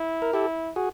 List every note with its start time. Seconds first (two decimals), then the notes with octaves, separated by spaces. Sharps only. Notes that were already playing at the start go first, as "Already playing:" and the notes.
Already playing: E4
0.22 A#4
0.33 E4 G4 A4
0.76 F#4 G#4